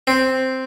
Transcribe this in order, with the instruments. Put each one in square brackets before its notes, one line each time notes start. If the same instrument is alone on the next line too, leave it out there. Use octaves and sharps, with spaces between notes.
[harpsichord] C4